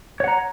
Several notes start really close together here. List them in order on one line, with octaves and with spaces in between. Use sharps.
C#5 F#5 A#5